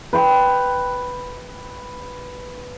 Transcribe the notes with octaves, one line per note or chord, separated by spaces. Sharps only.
B4 G5 C6